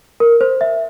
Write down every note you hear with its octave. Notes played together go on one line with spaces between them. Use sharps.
A#4
C5
E5